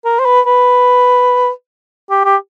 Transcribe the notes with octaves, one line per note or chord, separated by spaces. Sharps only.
A#4
C5
B4
B4
G4
G4